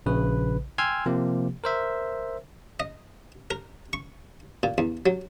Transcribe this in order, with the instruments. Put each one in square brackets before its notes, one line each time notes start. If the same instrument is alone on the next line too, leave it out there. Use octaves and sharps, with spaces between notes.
[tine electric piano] A#1 C#3 B4
G5 G#5 C6 E6 F6 G#6
C3 F3 A#3 G4
A#4 C5 E5
[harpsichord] D#5
A#4
C#6
A#2
E2
F#3